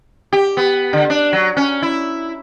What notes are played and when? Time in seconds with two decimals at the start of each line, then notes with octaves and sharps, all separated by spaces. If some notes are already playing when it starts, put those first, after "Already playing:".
0.33 G4
0.57 B3
0.93 D3
1.10 D4
1.33 F#3
1.57 C#4
1.82 E4